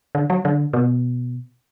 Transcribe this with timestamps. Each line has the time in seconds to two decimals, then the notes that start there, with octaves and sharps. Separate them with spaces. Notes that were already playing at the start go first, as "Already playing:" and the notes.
0.15 D3
0.30 F#3
0.45 D3
0.73 B2